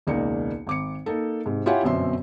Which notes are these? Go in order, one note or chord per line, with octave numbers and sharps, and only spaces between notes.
E1 C#2 A#3 D#4 D5 C#7
G#1 D6 C#7
A#3 D#4 A4
G#2 C3
E4 F4 G4 C#5 F#5 G#5
G1 F#2 B2 C4 E5 C6